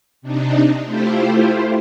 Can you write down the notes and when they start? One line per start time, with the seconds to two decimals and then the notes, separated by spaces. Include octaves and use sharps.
0.22 C3 D4 D#4
0.84 A3 E4 F4 G4 C5